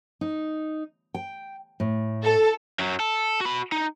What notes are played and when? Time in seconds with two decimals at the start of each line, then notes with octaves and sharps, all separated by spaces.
0.21 D#4
1.14 G5
1.80 A2
2.23 A4
2.79 F#2 F#3
3.00 A4
3.41 F#4 B5
3.72 D#4